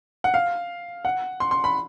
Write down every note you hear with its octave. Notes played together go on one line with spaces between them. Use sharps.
F#5
F5
F#5
C6
C6
B5